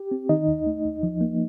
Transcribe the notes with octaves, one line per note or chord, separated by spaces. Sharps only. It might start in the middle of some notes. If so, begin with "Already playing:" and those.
Already playing: G4
C4
D#3 D#4 D#5
D#2
A3
D#2
F3
A#3